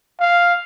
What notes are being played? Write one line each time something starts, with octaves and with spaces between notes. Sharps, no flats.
F5